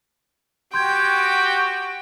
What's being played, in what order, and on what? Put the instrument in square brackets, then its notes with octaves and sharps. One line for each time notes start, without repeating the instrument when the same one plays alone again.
[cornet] F#4 [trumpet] G4 [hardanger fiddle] G5 [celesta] C6 G6 G#6